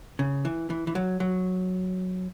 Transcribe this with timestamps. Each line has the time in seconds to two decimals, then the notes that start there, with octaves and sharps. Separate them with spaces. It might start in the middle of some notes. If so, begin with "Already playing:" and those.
0.19 C#3
0.45 E3
0.70 E3
0.87 E3
0.95 F#3
1.20 F#3